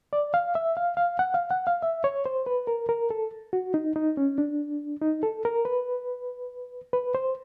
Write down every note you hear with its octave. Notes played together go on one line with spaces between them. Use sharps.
D5
F5
E5
F5
F5
F#5
F5
F#5
F5
E5
C#5
C5
B4
A#4
A#4
A4
F#4
D#4
D#4
C#4
D4
D#4
A4
A#4
B4
B4
C5